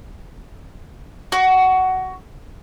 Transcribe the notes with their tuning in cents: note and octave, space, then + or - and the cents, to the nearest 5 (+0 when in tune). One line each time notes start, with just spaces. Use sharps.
F#4 +15